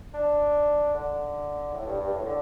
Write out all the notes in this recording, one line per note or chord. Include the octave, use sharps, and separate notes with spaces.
D4
D3
A2
G2
G2
A2
D3